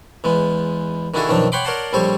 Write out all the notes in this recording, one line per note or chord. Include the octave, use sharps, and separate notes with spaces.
E2 G#3 B3
D#3 D4 E4 F#4 G#4 A4
B1 F#2 D#3 F3 D4 A5
C#5 F#5 G5 B5 C6 D6
A#4 C#5 D5 F#5 A5 C6
A#1 G3 A4 C5 C#5 C#6